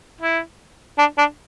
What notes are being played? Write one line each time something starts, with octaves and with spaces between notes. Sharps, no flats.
E4
D4
D4